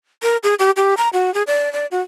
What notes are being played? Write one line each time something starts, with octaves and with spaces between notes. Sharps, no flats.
A#4
G#4
G4
G4
A#5
F#4
G#4
D5
D5
F#4